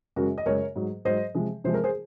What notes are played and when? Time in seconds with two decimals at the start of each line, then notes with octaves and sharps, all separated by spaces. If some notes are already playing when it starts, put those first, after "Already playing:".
0.16 F#2 C#3 G#3 F#4 A#4
0.38 D#5
0.46 F#2 C#3 G#3 A#4 C#5
0.76 G#2 F#3
1.05 G#2 F#3 C5 D#5
1.35 C3 F3 G#3
1.64 C3 F3 G#3 C5
1.74 A#4
1.84 G#4 C5